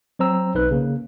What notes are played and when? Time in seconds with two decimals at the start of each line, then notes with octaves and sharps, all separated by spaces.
0.19 F#3 C4 C5 A#5 E6
0.55 B1 D#4 B4 F#6
0.71 C#3 A#3